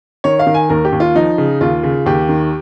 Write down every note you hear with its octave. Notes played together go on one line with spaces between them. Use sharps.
D#3 C#5
F5
D#3
G#5
D#2 A#4
G4
D#2
F4
F3 D#4
C#3
D#2 F4
C#3
D#2 G4
D#3